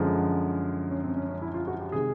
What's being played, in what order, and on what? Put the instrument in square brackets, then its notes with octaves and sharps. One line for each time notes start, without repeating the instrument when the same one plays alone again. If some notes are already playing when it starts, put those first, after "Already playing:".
Already playing: [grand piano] F#2 D3 F3 G#3
C#4
C4
C#4
C#4
E4
F4
F#4
G4
C3 D#3 G#3 G#4